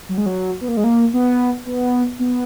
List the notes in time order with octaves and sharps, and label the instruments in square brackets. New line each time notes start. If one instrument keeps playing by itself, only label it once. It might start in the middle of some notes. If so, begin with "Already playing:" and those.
[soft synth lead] F#3
G#3
F#3
B3
A#3
G#3
A#3
B3
B3
B3